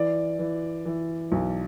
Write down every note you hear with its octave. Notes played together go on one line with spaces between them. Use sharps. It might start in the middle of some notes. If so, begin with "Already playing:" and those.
Already playing: E3 D5
E3
E3
B1